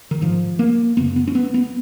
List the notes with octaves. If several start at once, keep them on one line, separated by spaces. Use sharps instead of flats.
D#3
G#2 F3
A#3
F#2 C#3 B3
B3
C#4
B3
B3